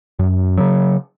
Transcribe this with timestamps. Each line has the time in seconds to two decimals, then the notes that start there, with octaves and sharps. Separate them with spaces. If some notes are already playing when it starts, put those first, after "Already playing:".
0.19 F#2
0.57 C#3 F#3